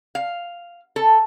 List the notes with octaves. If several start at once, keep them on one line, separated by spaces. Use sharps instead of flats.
F5
A4